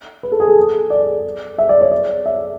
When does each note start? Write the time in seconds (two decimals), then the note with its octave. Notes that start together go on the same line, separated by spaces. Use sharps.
0.23 B4
0.32 A4
0.40 G#4
0.48 A4
0.90 D5
1.58 E5
1.69 D5
1.81 C#5
1.92 D5
2.26 E5